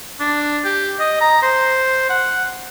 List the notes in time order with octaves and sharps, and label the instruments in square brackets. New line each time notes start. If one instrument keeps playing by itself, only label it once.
[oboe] D4
G4
D#5
A#5
C5
F#5